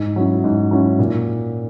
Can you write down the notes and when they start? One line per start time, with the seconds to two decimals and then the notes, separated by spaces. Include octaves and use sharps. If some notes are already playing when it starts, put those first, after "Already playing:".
Already playing: G#2
0.16 F#3 C#4 E4
0.44 G#2
0.71 F#3 C#4 E4
0.99 A#2